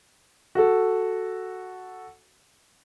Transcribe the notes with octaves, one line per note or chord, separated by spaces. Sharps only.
F#4 A4